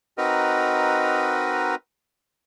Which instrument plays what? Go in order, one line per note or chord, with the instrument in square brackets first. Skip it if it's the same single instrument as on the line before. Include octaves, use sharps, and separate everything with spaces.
[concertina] C4 D#4 F#4 A#4 B4 D#5